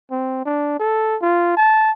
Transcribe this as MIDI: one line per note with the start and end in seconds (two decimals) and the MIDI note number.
0.11 0.42 60
0.46 0.75 62
0.79 1.16 69
1.22 1.55 65
1.57 1.91 81